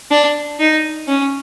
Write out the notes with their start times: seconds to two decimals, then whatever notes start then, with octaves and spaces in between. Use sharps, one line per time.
0.11 D4
0.60 D#4
1.08 C#4